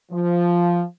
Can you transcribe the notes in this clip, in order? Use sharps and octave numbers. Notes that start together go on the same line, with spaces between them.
F3